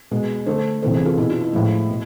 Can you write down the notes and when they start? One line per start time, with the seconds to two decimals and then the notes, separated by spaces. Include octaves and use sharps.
0.11 B2 G#3 B3
0.46 D3 A3 A4 C5
0.82 C3 E3 B3 A4 C5
0.94 G#4 B4
1.05 F4 A4
1.17 B2 B3 E4 G#4
1.29 D4 F4
1.41 E4
1.53 A2 F3 G#3 E4
1.89 B2